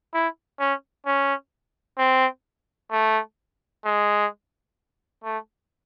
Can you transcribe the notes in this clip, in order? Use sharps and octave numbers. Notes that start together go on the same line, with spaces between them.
E4
C#4
C#4
C4
A3
G#3
A3